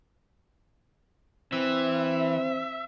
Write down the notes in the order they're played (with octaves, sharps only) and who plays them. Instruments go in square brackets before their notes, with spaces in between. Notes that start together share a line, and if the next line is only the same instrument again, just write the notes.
[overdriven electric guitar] E3 [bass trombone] C4 [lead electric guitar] E5